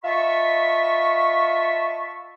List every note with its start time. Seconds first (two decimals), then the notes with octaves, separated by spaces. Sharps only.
0.04 F4 D#5 E5 A5 B5 C#6